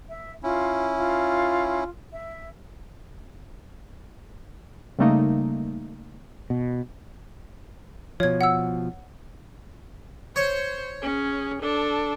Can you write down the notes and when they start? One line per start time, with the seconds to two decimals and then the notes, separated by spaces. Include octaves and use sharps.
0.09 E5
0.43 C#4 E4 F4
0.96 F4
2.12 E5
4.99 C#3 G3 A3 A#3 D#4
6.50 B2
8.20 B2 F3 C#5 G#6
8.41 F#5 E6
10.36 C5 C#5
11.02 C#4 G#4
11.61 D4 A4